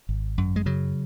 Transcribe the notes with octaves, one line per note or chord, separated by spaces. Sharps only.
G#1
F#2
G#3
C#3 F#3